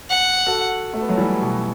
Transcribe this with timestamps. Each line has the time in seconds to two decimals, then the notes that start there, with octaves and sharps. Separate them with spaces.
0.11 F#5
0.46 F#4 A4
0.94 A3
1.01 B3
1.09 F#3 A3
1.18 E3 G3
1.42 B2